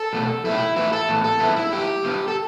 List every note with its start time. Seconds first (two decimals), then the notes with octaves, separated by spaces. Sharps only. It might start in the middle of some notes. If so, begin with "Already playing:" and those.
Already playing: A4
0.13 E2 B2 A3
0.44 E2 B2 A3 E4
0.76 A2 E3 B3 E4
0.93 A4
1.09 A2 E3 B3
1.24 A4
1.40 G2 E3 B3 E4
1.56 E4
1.72 G2 E3 B3 G4
2.04 G2 D3 B3
2.28 A4